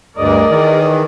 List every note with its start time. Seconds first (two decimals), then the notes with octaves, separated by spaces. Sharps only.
0.18 D2 G2 G#4 A#4 D5 D#5
0.49 D#3 E3